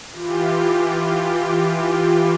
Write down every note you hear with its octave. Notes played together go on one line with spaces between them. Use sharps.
E3 F4 G4